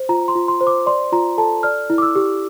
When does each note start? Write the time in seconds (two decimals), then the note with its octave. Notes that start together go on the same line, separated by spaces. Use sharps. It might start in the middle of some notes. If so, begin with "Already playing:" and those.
Already playing: C5
0.09 F4 A#5
0.28 C6
0.35 F4
0.48 C6
0.61 C5
0.67 D6
0.86 D5 C6
1.12 F4 A#5
1.38 A4 A5
1.63 D5 F6
1.90 E4
1.98 D6
2.02 E6
2.15 G4